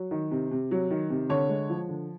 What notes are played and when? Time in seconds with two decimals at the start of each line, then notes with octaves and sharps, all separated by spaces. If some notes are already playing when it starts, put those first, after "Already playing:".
Already playing: F#3
0.11 D#3
0.31 C3
0.51 C3
0.71 F#3
0.91 D#3
1.10 C3
1.29 D3 C#5
1.49 G#3
1.70 F3
1.89 D3